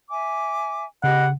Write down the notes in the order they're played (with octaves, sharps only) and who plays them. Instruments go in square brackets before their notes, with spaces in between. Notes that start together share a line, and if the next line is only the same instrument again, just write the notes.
[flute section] E5 G#5 D6
[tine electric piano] C#3 [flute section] G4 D#5 B5 [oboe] F#5